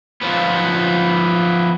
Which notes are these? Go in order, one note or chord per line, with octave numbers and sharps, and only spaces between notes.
F3 B3